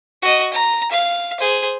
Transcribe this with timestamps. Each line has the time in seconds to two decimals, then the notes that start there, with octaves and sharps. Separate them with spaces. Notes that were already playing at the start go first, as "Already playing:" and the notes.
0.22 F#4 D#5
0.53 A#5
0.91 F5
1.40 G#4 C5